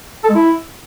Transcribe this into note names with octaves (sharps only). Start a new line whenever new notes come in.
A4
G#3
E4